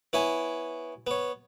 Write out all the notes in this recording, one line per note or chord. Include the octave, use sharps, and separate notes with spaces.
B3 E4 C#5 G#5
B3 C#5